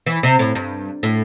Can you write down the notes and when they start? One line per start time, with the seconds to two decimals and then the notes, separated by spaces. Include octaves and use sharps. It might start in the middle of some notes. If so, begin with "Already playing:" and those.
0.06 E3
0.23 C3
0.39 A2
0.55 G2
1.03 A2